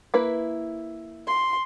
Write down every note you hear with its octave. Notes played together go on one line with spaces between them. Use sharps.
A#3 E4 B4
C6